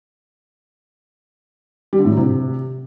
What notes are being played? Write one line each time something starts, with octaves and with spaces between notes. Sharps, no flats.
G3
D3
A2
F#3
C3